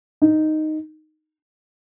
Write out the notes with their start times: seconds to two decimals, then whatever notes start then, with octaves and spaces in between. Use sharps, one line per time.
0.22 D#4